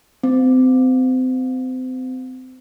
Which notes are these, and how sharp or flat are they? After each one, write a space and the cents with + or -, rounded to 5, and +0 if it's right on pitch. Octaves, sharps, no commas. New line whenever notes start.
C4 -30